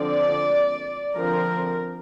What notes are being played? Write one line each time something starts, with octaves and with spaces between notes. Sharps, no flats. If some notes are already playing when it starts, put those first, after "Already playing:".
Already playing: D3 F3 C4 D5
D3 F3 C4 A#4